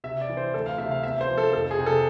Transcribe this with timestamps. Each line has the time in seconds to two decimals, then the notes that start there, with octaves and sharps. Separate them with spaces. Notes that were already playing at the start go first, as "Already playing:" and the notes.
0.04 C3 E5
0.21 D5
0.29 E3
0.37 C5
0.54 D2 A4
0.66 F5
0.78 C3 E5
0.91 F5
1.03 E2 E5
1.21 C5
1.29 F3
1.38 A4
1.53 F1 A4
1.71 G#4
1.78 C3
1.86 A4